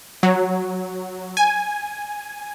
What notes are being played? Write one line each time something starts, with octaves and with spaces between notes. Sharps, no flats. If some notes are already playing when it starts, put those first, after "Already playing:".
F#3
G#5